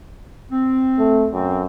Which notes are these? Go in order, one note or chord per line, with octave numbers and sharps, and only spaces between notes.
C4
A3
F#2 C4